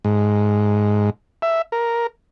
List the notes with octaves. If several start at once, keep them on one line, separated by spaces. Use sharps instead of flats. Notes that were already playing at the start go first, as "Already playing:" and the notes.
G#2
E5
A#4